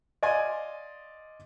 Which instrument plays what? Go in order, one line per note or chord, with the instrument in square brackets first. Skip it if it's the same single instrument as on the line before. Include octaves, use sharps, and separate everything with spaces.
[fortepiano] D5 D#5 F5 G#5 C6